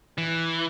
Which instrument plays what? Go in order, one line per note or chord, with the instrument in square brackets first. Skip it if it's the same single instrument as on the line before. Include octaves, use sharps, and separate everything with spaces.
[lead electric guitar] E3